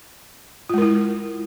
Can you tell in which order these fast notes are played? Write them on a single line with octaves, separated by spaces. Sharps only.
F4 G#3 A#4 E4